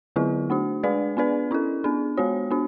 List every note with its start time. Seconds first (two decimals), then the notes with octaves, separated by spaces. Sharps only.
0.16 D3 F#3 B3 E4 G#4
0.50 A3 D4 F#4
0.83 G#3 D4 G#4 B4 D5
1.17 B3 D4 G#4 B4 D5
1.51 C#4 E4 A4
1.84 B3 D4 G#4
2.17 G#3 B3 F#4 C#5
2.51 B3 D4 F#4